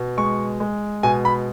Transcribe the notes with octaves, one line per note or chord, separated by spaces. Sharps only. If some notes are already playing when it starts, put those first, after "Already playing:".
Already playing: B2
G#3 C#6
G#3
B2 G#5
B5